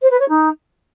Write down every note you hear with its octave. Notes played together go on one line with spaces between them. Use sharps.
C5
B4
C#5
D#4